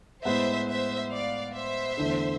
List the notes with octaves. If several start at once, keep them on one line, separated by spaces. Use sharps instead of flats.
A2 G#3 B3 C5 E5
C5 E5
D5 F5
C5 E5
E2 D3 A3 D4 A4